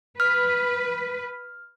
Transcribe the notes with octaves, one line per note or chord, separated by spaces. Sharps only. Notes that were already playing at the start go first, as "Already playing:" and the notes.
B4 F6